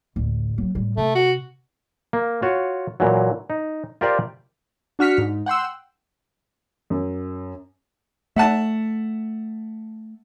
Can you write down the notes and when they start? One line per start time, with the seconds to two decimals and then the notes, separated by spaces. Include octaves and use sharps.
0.16 A1 D2
0.58 F#3 C#4
0.75 A2 G3
0.97 C3 A3
1.15 F#4
2.13 A#3
2.42 F4 F#4 C#5
3.00 A#2 E3 F#3
3.50 D#4
4.01 F4 G4 A#4 C5 D5 G5
4.99 D4 F#4 F6 B6 C#7
5.18 G#2
5.46 F#5 G5 C6 E6
6.90 F#2
8.36 A3 E5 F#5 A5